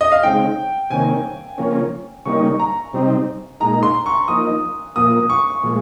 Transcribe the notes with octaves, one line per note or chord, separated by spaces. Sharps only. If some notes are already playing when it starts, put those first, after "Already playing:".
D#5
F5
C#3 G#3 C4 D#4 G5
C3 D#3 A#3 C#4 G#5
C#3 F3 A#3 C#4
C#3 G3 A#3 D#4 C#6
A#5
C3 G3 C4 D#4
A#2 G#3 D#4 A#5
C6
C#6
F3 A#3 D#4 D#6
A#2 F3 A#3 D#6
C#6
A#2 F3 G#3